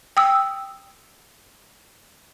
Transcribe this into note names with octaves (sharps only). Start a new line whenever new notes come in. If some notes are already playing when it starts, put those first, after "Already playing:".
G5 D#6 E6